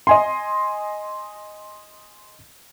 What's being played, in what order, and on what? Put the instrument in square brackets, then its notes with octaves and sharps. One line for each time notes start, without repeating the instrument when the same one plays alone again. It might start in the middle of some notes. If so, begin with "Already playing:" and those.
[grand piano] D#5 G#5 C6